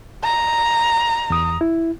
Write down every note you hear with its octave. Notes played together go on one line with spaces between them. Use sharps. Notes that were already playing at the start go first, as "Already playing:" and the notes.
A#5
E2 D#6
E4